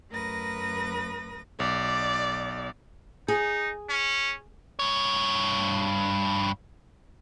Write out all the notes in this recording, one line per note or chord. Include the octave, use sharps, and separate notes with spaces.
F#2 A3 A#4 B4 D#6 A#6
B1 D5
D#4 G#4
C#4
G2 C#5